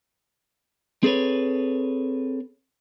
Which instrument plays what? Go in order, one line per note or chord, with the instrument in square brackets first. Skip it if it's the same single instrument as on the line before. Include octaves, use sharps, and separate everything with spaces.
[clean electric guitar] C4 G#4 A4 B4 C#5